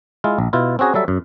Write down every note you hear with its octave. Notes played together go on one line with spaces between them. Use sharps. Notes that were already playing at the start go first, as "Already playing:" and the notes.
G#3 E4 F4
A#1
B2 E4 F4
C4 C#4 F#4 G#4 A#5
F#3 G3 A4 E5
F#2